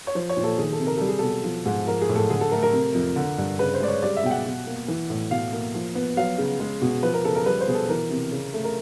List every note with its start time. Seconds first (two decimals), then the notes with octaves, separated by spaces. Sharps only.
0.07 C#5
0.15 F3 C5
0.29 C#5
0.37 A#2
0.44 A4
0.58 D#3 G#4
0.72 A4
0.80 C3
0.87 A#4
0.97 G3 A4
1.08 G#4
1.19 B2 A4
1.44 F3
1.66 G#2
1.87 F3 A#4
2.01 G#4
2.09 A2
2.16 A4
2.30 D3 G#4
2.41 A4
2.51 A3 A#4
2.63 A#4
2.73 C3
2.95 F2
3.16 D3
3.38 G2
3.59 C#3 B4
3.74 C5
3.81 G#3 D5
3.88 C#5
4.03 G3 D5
4.17 E5
4.24 B2 G5
4.31 F#5
4.45 B2
4.67 A#3
4.88 E3
5.10 A2
5.31 B2 F5
5.53 A#3
5.74 F3
5.95 B3
6.17 F#3 F5
6.38 C#3
6.60 G#3
6.82 B2
7.03 F3 B4
7.14 A#4
7.24 C#3 A4
7.35 A#4
7.46 G3 B4
7.61 C5
7.68 B2 G#4
7.74 A4
7.89 E3 A#4
8.10 C3
8.32 C#3
8.54 A3
8.64 A#4